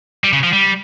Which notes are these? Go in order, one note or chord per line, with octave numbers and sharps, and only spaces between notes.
G3
C#3
F3
G3